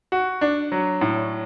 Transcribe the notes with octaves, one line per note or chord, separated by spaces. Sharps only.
F#4
D4
F#3
A2